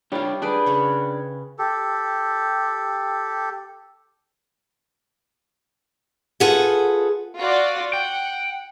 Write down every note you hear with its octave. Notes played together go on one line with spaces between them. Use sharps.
G3 D4 F4 G4 C#5
D4 G#4 B4 G5
C#3 C#5 B5
G4 A4
F4 G#4 A4 B4 F#5
F4 F#4 D5
F#5 G5